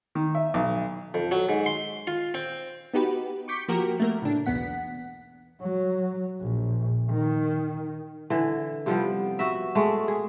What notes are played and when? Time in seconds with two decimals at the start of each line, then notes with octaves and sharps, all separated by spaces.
0.15 D#3
0.35 E5
0.54 B1
1.14 F2
1.31 F#3
1.49 G#2
1.66 C6
2.07 F4
2.34 C4
2.94 B3 D#4 F#4 G4 B4
3.48 C#6 D6 G6 B6 C#7
3.68 F3 A#3 F#4 G4 A#4
4.00 A3 A#3 A#4
4.22 A2 C#3 D4
4.46 B1 E2 B3 F#5 B6
5.61 F#3
6.41 A#1
7.10 D#3
8.30 D3 E3
8.86 C3 F3 G3 B3
9.39 F#4 B4 E5
9.75 G#3 A3
10.08 G#4